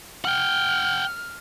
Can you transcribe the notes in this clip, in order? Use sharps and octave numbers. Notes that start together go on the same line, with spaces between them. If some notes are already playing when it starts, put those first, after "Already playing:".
F#5 G5 F6